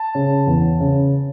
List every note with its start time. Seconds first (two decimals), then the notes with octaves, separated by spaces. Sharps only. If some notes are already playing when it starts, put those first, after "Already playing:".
Already playing: A5
0.15 C#3
0.47 E2
0.80 C#3